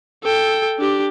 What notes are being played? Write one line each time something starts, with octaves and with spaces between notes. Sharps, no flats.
A4 G5
D4 G4